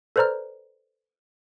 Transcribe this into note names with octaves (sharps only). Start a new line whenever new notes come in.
A4 B4 C5 D5 A#5 F6